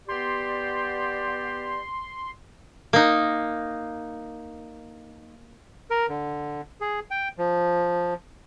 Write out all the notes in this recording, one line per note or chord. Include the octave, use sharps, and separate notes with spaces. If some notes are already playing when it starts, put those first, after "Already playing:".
B3 G4 D5 C6
A#3 D#4
A#4
D3
G#4
G5
F3